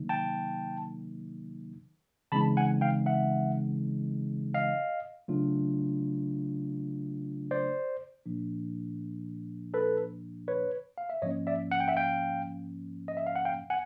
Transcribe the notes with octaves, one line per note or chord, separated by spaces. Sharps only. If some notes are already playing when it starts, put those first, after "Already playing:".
Already playing: C3 D#3 F#3 A#3 D#4
G5 A5
C#3 E3 G#3 C4 D#4 A5 B5
F#5 G#5
F5 G5
E5 F#5
D#5 F5
C#3 F#3 A3 D4 F4
C5 D5
A#2 F3 A#3 D4
A4 B4
B4 C#5
F5
E5
G#2 F3 A#3 C#4 C#5 D#5
D5 E5
F#5
G5
E5 F#5
F5 G5
D#5
E5
F5
F#5
F5 G5
F#5 G#5